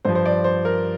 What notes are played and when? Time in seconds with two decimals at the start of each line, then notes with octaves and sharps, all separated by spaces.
0.05 G2 F3 C5
0.15 C5
0.25 D5
0.44 C5
0.65 A#4